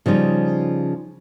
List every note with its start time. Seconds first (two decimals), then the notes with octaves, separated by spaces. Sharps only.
0.06 C#3 F3 G3 D#4